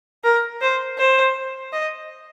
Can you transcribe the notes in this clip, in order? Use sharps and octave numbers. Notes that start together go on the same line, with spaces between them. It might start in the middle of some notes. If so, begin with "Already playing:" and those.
A#4
C5
C5
D#5